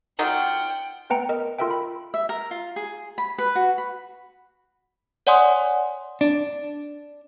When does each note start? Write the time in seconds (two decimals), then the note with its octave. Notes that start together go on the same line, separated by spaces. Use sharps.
0.19 F#3 D#4 F4 F#5 G5
1.10 A3 B3 B4 G5 A#5 C#7
1.29 A#4 D#5
1.59 F4 A4 A#4 E5 G5
1.71 B5
2.14 E5
2.29 A#4
2.51 F4
2.76 G#4
3.18 B5
3.38 B4
3.55 F#4
3.78 B5
5.27 C#5 D5 F#5 G#5 C6 D#6
6.21 D4